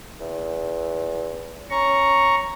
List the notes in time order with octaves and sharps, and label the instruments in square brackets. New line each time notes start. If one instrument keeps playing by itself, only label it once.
[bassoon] E2
[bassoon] C#4 [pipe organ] A#5 C#6